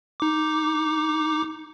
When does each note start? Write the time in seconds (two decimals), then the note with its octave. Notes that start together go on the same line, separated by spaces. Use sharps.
0.20 D#4 D6